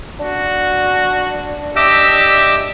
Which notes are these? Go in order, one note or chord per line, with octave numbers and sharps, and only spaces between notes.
D4 F#4
G4 D#5 E5 D6 E6